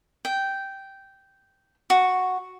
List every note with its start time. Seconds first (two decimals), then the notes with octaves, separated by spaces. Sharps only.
0.25 G5
1.90 F#4